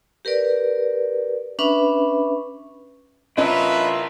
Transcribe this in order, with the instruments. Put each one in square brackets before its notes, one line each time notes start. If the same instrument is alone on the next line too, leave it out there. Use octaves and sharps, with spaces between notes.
[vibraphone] G4 A#4 B4 D5
C#4 D4 B4 E5 B5 C#6
[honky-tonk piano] C#4 D#5 [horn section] D4 F4 E5 [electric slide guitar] E4 A#4 [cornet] B4